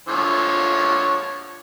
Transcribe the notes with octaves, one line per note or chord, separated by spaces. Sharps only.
D3 F3 C#5